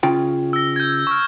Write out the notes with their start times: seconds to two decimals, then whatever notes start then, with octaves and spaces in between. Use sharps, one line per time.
0.03 C#3 F4 G5
0.53 E6 A#6
0.76 G6 G#6
1.07 C#6 F6